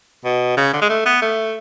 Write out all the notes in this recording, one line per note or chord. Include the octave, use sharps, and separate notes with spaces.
B2
C#3
D3
G#3
A3
B3
A3